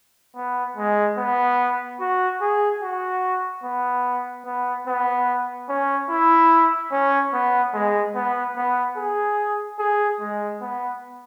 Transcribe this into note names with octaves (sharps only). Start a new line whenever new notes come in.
B3
G#3
B3
F#4
G#4
F#4
B3
B3
B3
C#4
E4
C#4
B3
G#3
B3
B3
G#4
G#4
G#3
B3